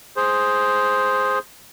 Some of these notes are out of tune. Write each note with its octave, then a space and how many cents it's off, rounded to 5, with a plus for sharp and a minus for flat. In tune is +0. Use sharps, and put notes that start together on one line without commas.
G#4 +0 C5 +0